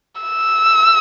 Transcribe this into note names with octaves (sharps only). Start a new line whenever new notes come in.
E6